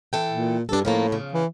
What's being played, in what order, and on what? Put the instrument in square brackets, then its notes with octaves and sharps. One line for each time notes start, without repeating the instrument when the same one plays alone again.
[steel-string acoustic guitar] E3 A4 G5
[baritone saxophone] A#2
[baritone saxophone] G2 [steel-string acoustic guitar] D4 A4
[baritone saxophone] A2 [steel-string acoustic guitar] C#3 F3 A#3
[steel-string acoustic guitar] C#3 F3
[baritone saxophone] E3